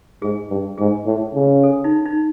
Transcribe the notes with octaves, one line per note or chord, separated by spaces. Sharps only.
G#2 G#4
G2
G#2 G#4
A2
C#3
A4
D#4
D#4